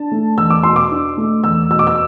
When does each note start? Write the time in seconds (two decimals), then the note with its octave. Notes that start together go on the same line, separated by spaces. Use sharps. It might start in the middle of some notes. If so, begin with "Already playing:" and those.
Already playing: D4 A5
0.12 A3
0.37 E2 E6
0.50 D6
0.63 B2 C6
0.76 D6
0.91 D4
1.17 A3
1.44 E2 E6
1.70 B2 E6
1.79 D6
1.87 E6